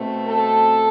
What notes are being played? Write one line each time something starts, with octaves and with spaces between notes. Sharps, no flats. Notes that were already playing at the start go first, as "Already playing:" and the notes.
Already playing: B2 A3 C4
A4